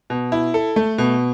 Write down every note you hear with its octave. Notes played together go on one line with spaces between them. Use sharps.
B2
E4
A4
A3
B2